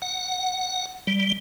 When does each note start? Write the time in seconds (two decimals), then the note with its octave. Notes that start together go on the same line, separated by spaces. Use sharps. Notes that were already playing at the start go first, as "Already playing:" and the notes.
0.02 F#5
1.07 G3